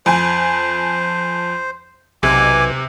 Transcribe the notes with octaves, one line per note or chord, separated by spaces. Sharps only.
F2 C5 G#5
B1 C3 G#5 D6